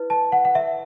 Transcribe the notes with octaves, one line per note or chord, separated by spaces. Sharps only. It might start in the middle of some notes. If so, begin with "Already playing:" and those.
Already playing: E4 B4
A5
F#5
F#5
E5